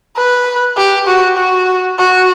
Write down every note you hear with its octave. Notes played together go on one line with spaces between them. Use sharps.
B4
G4
F#4
F#4
F#4